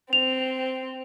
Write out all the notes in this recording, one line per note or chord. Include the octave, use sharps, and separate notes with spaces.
C4 F7